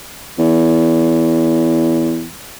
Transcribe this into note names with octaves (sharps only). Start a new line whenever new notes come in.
E2